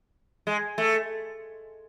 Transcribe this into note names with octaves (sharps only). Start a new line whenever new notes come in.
G#3
A3